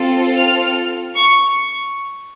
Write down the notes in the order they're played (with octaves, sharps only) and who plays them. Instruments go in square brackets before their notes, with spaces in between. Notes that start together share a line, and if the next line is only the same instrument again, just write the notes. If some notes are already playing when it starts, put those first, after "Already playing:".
Already playing: [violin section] C4 F4 A4
F6
C#6